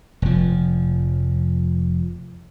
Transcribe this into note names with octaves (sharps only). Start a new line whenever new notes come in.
F1 F3